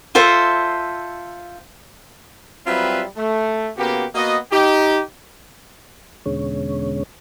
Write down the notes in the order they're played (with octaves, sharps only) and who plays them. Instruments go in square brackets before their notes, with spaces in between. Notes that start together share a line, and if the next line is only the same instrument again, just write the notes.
[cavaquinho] F4 A4 C5 E5
[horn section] F#3 G3 C4 F4 B4 E5
A3
C#3 A#3 B3 F#4 G4
A#3 B3 F#4 D#5
D#4 G4
[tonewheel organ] E2 B2 D3 G#3 C#4 C#5